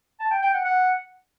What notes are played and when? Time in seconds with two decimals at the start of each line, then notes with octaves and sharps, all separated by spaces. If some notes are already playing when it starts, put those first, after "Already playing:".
0.19 A5
0.31 G5
0.42 G5
0.53 F#5
0.65 F#5